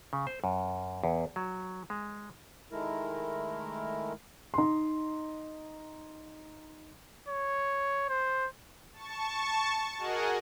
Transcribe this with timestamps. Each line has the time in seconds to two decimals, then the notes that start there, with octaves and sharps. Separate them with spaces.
0.13 C#3
0.27 C5
0.44 F#2
1.04 E2
1.36 F#3
1.90 G#3
2.72 D#3 G#3 A3 E4 A#4
4.54 D#4 C6
7.28 C#5
8.09 C5
8.93 A5 C#6
9.99 F#4 G#4 A#4 D#5 F#5 G#5